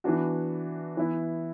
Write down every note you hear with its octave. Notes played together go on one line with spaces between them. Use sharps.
E3 B3 D4 F#4
E3 B3 E4